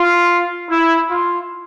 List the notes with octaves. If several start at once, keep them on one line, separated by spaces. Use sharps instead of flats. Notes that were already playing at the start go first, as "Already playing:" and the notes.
Already playing: F4
E4
F4